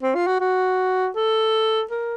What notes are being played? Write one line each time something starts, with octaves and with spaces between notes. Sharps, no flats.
C4
F4
F#4
F#4
A4
A#4